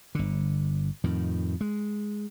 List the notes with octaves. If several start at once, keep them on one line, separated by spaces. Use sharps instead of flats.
G1 D3
F2 A2 D#3
G#3